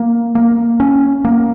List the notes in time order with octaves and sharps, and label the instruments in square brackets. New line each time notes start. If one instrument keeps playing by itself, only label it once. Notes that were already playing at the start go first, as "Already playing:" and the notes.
Already playing: [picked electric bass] A#3
A#3
C#4
A#3